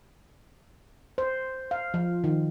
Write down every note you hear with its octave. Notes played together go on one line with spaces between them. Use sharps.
C5
F5
F3
D#3